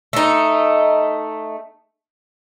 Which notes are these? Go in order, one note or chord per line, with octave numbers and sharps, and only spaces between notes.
A3 D#4